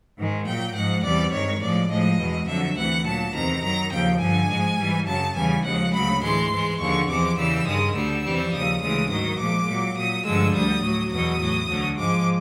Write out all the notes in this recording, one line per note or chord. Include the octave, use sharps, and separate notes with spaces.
G#2 D#3 G#3
A#2 F#3 G5
G#2 F3 G#3 F#5
E2 C3 E3 G3 D5
G2 D#3 G#3 C#5
A2 F3 G#3 D5
A2 F3 G#3 D#5
E2 B2 G#3
F2 D3 F#3 E5
D2 C3 E3 F#5
A#2 F#3 A5
E2 C3 D#3 A#5
F#2 D#3 F#3 A#5
D#2 C#3 F3 G5
G2 D3 F3 G#5
G#2 F3 G#3
G#2 E3 G3
F#2 C#3 F#3 A5
E2 C#3 E3 G3 G#5
D#2 C#3 F3 G#3 F#5
D2 C#3 F#3 B5
A2 E3 G#3 C6
G#2 E3 G#3
D#2 D3 F3 G#3 C#6
E2 C3 F3 G#3 D6
E2 C#3 E3 G3 E6
G2 D#3 G#3 D#6
D2 D3 G3 E6
F2 C3 E3 G3
D#2 C#3 F3 D#6
D2 C#3 E3 G#3 D#6
G#2 D#3 F#3 D#6
A#2 F3 G#3 D6
A#2 F#3
A#2 F#3 D#6
G2 D3 F3 G#3 E6
D2 D3 G3 D#6
A2 F#3
E2 B2 F#3 D#6
A2 F#3
D2 D3 F#3
G#2 F3 G#3 D6